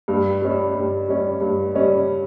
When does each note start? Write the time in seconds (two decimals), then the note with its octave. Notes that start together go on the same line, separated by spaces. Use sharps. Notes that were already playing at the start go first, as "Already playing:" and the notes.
0.08 G2
0.42 G3 C#4
0.75 G2
1.08 G3 C#4
1.41 G2
1.75 G3 C#4